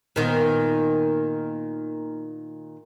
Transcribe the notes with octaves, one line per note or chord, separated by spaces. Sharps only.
A#2 D#3 B3